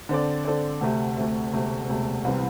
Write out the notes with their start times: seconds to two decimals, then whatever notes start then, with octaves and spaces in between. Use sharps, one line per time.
0.09 D3 C4 A4 D5
0.45 D3 C4 A4 D5
0.81 D2 C3 A3
1.17 D2 C3 A3
1.53 E1 D2 C3 A3
1.89 E1 D2 C3 A3
2.24 C2 C3 E3 G3 C4